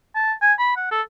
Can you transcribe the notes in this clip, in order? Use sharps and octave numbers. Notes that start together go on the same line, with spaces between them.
A5
G#5
B5
F#5
A4